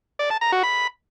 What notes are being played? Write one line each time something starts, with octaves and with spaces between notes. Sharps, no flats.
D5
A5
A#5
F#4
B5